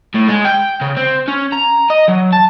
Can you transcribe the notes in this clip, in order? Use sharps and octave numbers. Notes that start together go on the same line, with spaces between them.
A2
G#3
G5
C#3
C4
C#4
A#5
D#5
F#3
A5